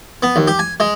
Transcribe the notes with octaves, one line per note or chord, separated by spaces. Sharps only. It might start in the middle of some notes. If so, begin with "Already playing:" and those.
B3
D#2
G4
G#5
G#3